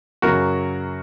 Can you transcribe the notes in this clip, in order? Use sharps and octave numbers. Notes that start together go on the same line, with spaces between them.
F#2 C#3 F#3 F#4 A#4